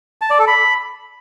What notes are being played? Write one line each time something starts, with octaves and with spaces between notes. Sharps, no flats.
A5
D5
A4
B5